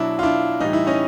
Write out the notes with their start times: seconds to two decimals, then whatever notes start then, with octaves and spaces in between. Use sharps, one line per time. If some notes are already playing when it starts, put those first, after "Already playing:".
Already playing: B2 F#3 D4 E4
0.19 F4
0.23 D4 E4
0.60 A2 E3 G3 D#4
0.73 E4
0.87 C#4 D#4